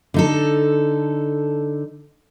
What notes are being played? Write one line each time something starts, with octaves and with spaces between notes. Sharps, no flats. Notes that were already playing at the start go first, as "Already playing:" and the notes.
D3 D#4 A4